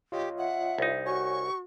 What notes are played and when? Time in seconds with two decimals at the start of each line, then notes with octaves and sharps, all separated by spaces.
0.12 F4 G4 C#5 D#5
0.38 E5 F#5
0.78 C2 D#4
1.06 F#4 C#5 G#5 C#6